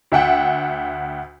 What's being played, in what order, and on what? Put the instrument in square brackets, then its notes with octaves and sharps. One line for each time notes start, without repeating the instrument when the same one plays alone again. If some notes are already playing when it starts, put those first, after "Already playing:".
[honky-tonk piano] D2 E5 F#5 G5